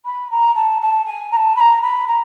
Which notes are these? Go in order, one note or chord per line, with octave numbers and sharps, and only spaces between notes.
B5
A#5
A5
A5
G#5
A#5
A5
B5
A#5
B5
A#5